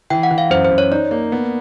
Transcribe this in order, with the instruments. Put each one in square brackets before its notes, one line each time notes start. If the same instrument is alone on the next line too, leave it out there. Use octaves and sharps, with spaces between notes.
[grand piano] E3 [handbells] G5
[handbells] F#5
[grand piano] E3
[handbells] F5
[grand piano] F#2 [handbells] C5
[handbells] C5
[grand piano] F#2
[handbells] C#5
[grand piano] D#4 [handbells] D5
[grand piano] A#3
B3